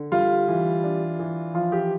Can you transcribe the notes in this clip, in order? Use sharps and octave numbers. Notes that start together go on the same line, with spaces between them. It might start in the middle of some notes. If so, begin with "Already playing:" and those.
Already playing: D3
G3 F4
E3
D4
E3
F3 F4
G4